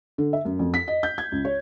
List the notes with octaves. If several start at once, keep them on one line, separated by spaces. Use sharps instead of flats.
D3
E5
F#2
F2
B6
D#5
G6
G#6
C#2
C#5